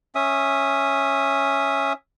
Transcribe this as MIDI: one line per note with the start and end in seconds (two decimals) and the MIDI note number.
0.15 1.93 61
0.15 1.93 76
0.15 1.93 87